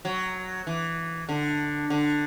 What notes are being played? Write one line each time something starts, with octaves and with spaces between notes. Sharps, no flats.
F#3
E3
D3
D3